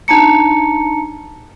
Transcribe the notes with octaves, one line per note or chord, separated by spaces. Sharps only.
D4 D#4 A5 A#5 C#7